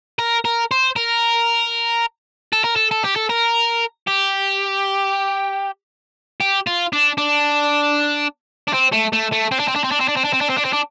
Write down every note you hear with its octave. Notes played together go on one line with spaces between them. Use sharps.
A#4
A#4
C5
A#4
A4
A#4
A4
A4
G4
A4
A#4
G4
G4
F4
D4
D4
D4
C4
A3
A3
A3
C4
D4
C4
D4
C4
D4
C4
D4
C4
D4
C4
D4
C4
D4
C4
D4